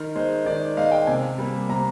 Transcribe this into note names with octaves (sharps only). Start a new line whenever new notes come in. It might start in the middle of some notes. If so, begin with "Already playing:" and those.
Already playing: D#3 A#4
G#3 C5
D#3 D5
G#3 F5
G5
C3 G#5
G3 A#3
C3 A#5